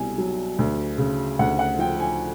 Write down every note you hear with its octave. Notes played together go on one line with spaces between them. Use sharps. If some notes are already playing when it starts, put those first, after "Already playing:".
Already playing: C2 B2 G#5
F#3
D2
C#3
D2 F#5
F#5
F3 G5
G#5